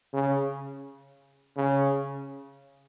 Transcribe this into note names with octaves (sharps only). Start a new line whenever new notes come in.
C#3
C#3